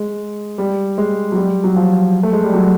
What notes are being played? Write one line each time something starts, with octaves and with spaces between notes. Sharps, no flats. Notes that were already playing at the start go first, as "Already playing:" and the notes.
Already playing: G#3
G3
G#3
F#3
G3
F#3
F3
A3
G#3
G3
F#3